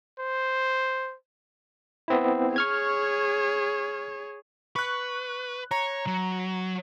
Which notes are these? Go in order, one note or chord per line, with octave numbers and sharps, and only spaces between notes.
C5
B3 C4 E4
G#4 C#5 C#6 F6 G#6
B4 C#6 F#6
C#5 A#5
F#3